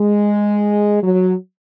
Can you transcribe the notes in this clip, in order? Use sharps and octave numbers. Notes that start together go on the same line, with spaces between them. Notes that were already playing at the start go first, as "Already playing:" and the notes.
Already playing: G#3
F#3